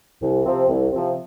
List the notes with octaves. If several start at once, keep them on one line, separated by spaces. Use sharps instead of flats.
C2
C3 F3 C4
C2
C3 F3 C4